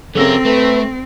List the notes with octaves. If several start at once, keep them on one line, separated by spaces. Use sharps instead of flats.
C#3 F#3 C4 A4 A#4 E6 A#6
A3 B4